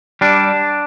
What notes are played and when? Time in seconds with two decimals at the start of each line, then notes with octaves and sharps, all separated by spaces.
0.21 G3 D4